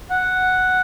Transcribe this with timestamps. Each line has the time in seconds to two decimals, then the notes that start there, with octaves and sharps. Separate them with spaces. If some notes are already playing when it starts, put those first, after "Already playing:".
0.10 F#5